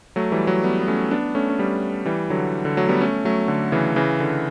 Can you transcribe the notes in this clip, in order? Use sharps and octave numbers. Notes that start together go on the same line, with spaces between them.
F#3 A3
E3 G3
F#3 A3
G3 B3
B3
A3 C#4
B3 D4
A3 C#4
C#4
G3 B3
E3 G3
D3 F#3
D3
F#3 A3
G3 B3
A3 C#4
F#3 A3
D3
C#3 E3
C#3 E3
D3